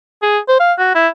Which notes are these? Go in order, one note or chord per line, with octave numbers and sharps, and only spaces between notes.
G#4
C5
F5
F#4
E4